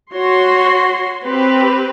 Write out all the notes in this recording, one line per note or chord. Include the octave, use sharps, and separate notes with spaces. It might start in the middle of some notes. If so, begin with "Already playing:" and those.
F#4 C#5 C6
C4 G4 B4